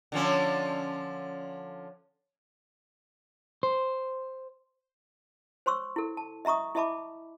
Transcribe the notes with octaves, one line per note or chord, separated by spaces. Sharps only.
D3 F3 C#4
C5
C5 C#5 C6 C#6 E6
E4 A4
A5
D#5 E5 A#5 C#6 D#6
E4 D#5 E5 A5 B5 D6